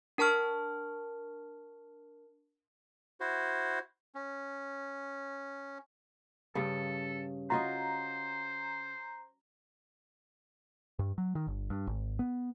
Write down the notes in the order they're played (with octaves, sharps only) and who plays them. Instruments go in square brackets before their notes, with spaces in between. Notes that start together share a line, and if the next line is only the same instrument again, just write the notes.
[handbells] D4 A#4 A5 C#6 F6
[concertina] E4 F#4 C5
C#4
[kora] G2 C#3 [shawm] A4
[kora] F4 F#4 D#5 [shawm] C5 [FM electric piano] A#5
[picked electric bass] G2
F#3
D#3
G1
G2
G#1
B3